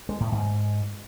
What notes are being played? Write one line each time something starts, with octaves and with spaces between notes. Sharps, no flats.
G#3
A2
G#2